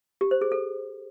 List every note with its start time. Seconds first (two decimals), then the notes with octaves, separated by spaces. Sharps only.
0.21 G4
0.31 C5
0.41 G#4
0.52 A4